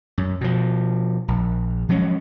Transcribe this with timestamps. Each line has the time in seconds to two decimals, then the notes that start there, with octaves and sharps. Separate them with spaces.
0.18 F#2
0.41 B2 F3
1.28 A#1
1.89 F3 F#3 G#3 C#4